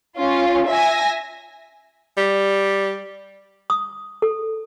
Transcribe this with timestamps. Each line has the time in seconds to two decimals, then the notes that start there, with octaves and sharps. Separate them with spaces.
0.18 C#4 F4
0.69 E5 G#5 A#6
2.17 G3
3.70 D#6
4.22 A4